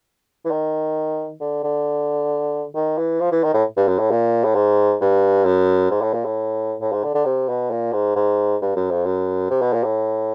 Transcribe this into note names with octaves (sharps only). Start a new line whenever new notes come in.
E3
D#3
D3
D3
D#3
E3
F3
E3
D#3
A2
G2
F#2
A2
A#2
A2
G#2
G2
F#2
G#2
A2
A#2
A2
A2
G#2
D3
D3
C3
B2
A#2
G#2
G#2
G2
F#2
F2
F#2
C3
B2
A#2
A2